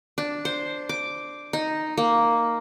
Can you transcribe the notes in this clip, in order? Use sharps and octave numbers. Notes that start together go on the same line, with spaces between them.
D4
C5
D6
D#4
A#3